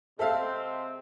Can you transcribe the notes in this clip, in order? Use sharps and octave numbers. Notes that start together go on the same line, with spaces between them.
C3 G#3 C4 A4 E5 F5